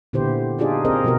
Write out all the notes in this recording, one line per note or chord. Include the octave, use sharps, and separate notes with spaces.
A#2 D3 B3 E4 G4 C5
D4 D#4 F4 G4 G#4 D5
C4 G#4 A#4 C5 D#5
B2 F3 B3 F4 F#4 A#4